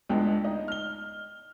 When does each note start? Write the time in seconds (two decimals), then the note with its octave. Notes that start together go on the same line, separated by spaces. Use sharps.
0.09 C#2 A2 G#3 B3 D4 G5
0.44 D#4 D#5
0.68 F6 G7